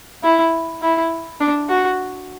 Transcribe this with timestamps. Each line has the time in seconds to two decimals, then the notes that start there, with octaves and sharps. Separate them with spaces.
0.24 E4
0.82 E4
1.41 D4
1.69 F#4